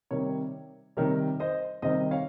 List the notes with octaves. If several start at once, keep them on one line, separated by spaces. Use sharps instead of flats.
C3 D#3 G3 A#4 C#5
C3 D#3 G3 A#4 C#5
C5 D#5
C3 D#3 G3 C5 D#5
C#5 F5